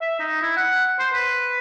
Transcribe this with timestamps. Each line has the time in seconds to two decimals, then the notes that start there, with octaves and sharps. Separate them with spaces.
0.02 E5
0.19 D#4
0.42 E4
0.57 F#5
0.99 C5
1.13 B4